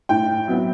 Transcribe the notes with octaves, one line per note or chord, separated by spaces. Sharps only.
A2 G5
F#3 B3 E4